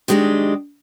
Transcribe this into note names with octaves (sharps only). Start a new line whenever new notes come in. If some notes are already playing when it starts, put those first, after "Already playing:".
D#3 F#3 G#3 D4 G4